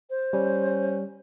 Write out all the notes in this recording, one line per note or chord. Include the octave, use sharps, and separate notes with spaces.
C5
G3 C#4